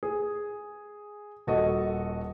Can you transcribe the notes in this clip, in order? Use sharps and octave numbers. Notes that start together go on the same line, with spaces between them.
G#4
D#1 F#4 A4 D#5